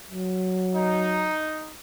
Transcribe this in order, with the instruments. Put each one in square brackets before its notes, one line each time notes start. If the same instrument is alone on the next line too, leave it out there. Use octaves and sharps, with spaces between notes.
[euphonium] F#3
[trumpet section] D#4